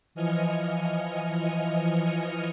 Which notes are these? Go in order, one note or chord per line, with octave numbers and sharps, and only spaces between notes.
E3 F3 D#5 G#5 F6 C#7